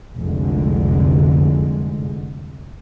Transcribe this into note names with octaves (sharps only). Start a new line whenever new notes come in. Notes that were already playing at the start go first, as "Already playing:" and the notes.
F1 C2 D3 G#3